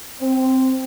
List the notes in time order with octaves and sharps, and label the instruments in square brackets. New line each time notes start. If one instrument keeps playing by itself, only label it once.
[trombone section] C4